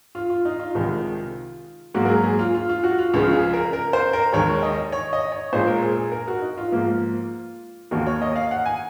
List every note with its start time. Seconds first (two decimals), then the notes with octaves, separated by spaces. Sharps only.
0.15 F4
0.30 F4
0.45 D#4
0.59 F4
0.75 C2 C3 D#3 G#3
1.94 G#2 F#3 A#3 F#4
2.05 A#4
2.09 G#4
2.24 G#4
2.39 F4
2.55 F4
2.69 F4
2.84 F#4
2.98 F4
3.13 C#2 C#3 F3 G#3 F4
3.33 G#4
3.53 A#4
3.73 A#4
3.93 C5
4.13 A#4
4.32 D#2 D#3 G#3 C#5
4.63 D#5
4.92 C#5
5.13 D#5
5.32 C#5
5.53 A#2 G#3 C5
5.67 A#4
5.82 G#4
5.97 G#4
6.12 A#4
6.28 F#4
6.42 D#4
6.57 F4
6.72 G#2 F3 A#3
7.91 D#2 D#3 A#3 F#4
8.07 C#5
8.22 D#5
8.36 F5
8.51 F#5
8.66 G#5